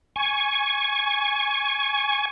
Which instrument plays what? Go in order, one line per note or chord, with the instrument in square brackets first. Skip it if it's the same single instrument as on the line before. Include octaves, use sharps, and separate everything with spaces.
[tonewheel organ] G#5 C#6